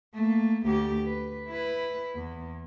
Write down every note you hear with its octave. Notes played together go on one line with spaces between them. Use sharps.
A3 A#3
D2 G4
B4
E4 B4
E2